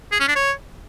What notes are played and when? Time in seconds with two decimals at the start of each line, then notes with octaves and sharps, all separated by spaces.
0.12 G#4
0.20 C#4
0.28 D4
0.36 C#5